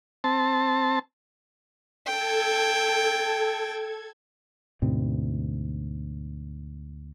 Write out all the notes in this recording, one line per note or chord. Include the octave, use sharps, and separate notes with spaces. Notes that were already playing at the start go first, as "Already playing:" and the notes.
C4 A5
A4 G5 G#6
D2 G#2 B2 C4